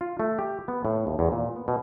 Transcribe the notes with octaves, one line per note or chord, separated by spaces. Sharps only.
F4
A3
G4
B3
A2
D#2
E2
A#2
B3
B2